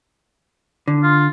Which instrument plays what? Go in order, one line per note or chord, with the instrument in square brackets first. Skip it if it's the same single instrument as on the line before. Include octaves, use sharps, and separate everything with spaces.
[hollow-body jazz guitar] D3
[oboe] F4